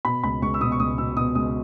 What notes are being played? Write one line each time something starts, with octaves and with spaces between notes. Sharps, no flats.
B2 B5
C#2 B5
C#2 C#6
E6
B2 D#6
C#6
C#2 D#6
B2 E6
B2 D#6
C#2 D#6